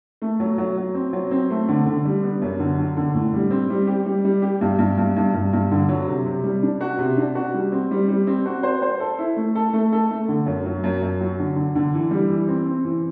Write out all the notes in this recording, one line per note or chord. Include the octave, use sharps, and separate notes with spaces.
A3
F#3
F#3
F#3
C4
F#3
C4
A3
D3
D3
G3
B3
F#2
D3
D3
D3
A2
G3
C4
G3
G4
G3
G3
G4
G2
G2
G2
G2
G2
G2
D3
F#3
C3
C3
G3
D4
F#4
C3
D4
F#4
G3
C4
G3
G3
C4
F#4
C5
C5
A4
E4
A3
A4
A3
A4
A3
D3
F#2
F#3
F#2
F#2
F#3
D3
D3
D3
E3
G3
E3
C4
C4
E3